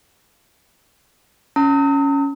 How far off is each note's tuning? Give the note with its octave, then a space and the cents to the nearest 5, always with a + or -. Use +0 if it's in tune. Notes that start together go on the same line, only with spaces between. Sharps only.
C#4 +10 A#5 -45 D#6 +45